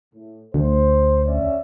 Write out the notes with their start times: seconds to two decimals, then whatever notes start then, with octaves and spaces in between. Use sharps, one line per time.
0.14 A2
0.54 D2 C5
1.25 C#4 D5 E5